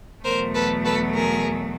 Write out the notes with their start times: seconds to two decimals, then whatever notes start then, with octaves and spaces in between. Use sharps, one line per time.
0.24 E2 B2 F#3 A3 A#4 C5
0.54 A4 B4
0.84 A4 B4
1.15 G#4 A#4